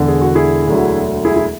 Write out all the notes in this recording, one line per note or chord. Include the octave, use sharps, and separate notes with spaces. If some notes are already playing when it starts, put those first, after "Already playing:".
Already playing: E1 E2 D3
G#4
F#4
E4 G#4
E1 D2 D3 F#3
E4 G#4
E4